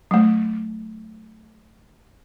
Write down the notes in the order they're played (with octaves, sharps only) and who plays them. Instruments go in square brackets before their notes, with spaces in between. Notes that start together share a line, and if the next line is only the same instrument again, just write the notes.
[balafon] F#3 A3